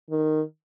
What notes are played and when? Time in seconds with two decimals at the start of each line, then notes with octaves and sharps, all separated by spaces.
0.10 D#3